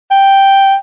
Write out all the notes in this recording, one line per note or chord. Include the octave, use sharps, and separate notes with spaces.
G5